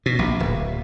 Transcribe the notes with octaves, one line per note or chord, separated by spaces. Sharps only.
B2
A#1
D1